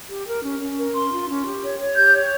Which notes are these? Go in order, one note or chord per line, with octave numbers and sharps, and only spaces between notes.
G4
A#4
C#4
C#4
A#4
C#4 C6
F4
C#4
G4
C#5
C#5
G4 G6
C#5